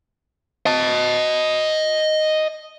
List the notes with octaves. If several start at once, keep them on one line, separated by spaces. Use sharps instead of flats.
D#5 A5